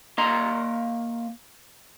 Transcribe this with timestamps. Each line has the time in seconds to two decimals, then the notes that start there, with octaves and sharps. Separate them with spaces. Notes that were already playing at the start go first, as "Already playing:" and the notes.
0.18 A#3 D#5 A#5 C6